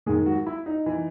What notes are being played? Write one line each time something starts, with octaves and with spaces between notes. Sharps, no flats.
G#2 D#3 G#3 G#4
F#3 F#4
E4
D#4
E3